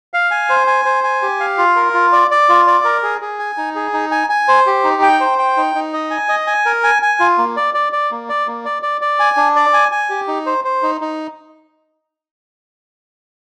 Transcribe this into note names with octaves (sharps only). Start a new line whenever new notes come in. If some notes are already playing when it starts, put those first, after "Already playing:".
F5
G#5
C5
G#5
C5
G#5
G4
F5
F4
A#4
F4
D5
D5
F4
D5
A#4
G#4
G#4
G#5
D#4
G#4
D#4
G#5
G#5
C5
G4
D#4
G5
C5
G5
D#4
D#4
D#5
G#5
D#5
G#5
A#4
G#5
G#5
F4
A#3
D5
D5
D5
A#3
D5
A#3
D5
D5
D5
G#5
D4
D5
G#5
G#5
G4
D#4
C5
C5
D#4
D#4